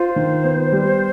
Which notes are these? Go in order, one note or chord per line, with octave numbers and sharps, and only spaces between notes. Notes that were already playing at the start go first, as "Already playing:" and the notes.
Already playing: F4 C5
D#3
B3
G3